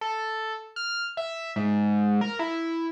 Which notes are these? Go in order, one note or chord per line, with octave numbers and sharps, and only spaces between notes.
A4
F6
E5
G#2
A#4
E4